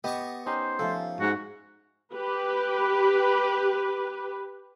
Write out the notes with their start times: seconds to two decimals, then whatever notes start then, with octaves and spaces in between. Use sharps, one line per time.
0.04 B3 G4 D#5 A5 C#6
0.46 C#4 D#4 G4 C5
0.79 F3 A3 C#4 A4
1.20 G#2 F#4
2.13 G4 B4